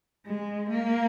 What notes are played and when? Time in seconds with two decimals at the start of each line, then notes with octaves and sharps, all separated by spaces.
0.26 G#3
0.70 A#3